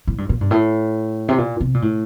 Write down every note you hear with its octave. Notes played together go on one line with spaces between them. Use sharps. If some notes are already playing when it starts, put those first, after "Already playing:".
A2
G2
A#2
G2
A2
C3
A#2
C3
A#2
A2